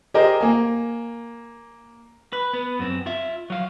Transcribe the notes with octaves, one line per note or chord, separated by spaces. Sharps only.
G4 G#4 A#4 C5 D#5
A#3 G#5
B4
B3
F#2 C4
F4 E5
F#3 F5